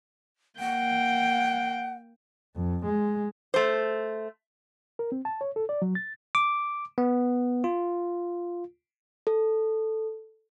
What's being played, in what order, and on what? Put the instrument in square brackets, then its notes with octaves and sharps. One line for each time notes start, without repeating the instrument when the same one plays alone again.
[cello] A#3 G5 [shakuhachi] F#5
[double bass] F2
G#3
[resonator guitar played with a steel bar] A3 C5
[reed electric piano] A#4
C4
A5
C#5
A4
D5
F#3
A6
[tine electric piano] D6
B3
F4
[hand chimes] A4